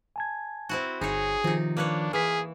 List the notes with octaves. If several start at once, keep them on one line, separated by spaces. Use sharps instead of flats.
G#5 A5 G#6
C4 E4 F#4
G1 D#4 G#4 C#5
C3 D#3 F3 D#4 F4
A#3 D4 B4 C#5
E3 G#4 F6 B6